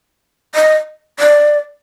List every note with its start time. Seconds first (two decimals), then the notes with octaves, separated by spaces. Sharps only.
0.55 D#5
1.19 D5